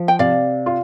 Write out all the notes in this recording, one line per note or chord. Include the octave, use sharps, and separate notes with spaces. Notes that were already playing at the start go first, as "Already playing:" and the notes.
Already playing: F3
G5
C3 D5 F5
F4